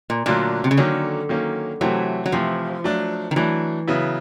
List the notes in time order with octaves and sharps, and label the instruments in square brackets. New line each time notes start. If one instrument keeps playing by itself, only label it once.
[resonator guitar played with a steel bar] A#2
[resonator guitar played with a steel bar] A#2 [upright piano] D3 F#3 A3 D4 F4
[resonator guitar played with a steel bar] C3
C#3
[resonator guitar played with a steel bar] D3 [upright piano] D#3 F#3 A#3 C#4
[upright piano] D#3 F#3 A#3 C#4
[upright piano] C3 E3 A3 C4 E4 [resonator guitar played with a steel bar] F#3
[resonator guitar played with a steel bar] F#3
[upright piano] C3 E3 A3 C4 E4 [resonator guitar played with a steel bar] F3
[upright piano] F#3 A3 D4
[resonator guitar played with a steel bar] D#3
[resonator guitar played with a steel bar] E3 [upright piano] F#3 A3 D4
[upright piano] C#3 F#3 B3 E4